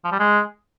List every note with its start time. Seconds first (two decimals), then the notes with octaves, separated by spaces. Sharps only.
0.04 F3
0.12 G3
0.20 G#3